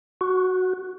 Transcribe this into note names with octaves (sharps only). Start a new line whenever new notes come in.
F#4